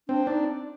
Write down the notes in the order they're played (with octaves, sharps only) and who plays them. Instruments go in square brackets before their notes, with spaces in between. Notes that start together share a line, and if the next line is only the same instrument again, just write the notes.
[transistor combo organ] C4 [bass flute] D4
[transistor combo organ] D4 [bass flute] D#4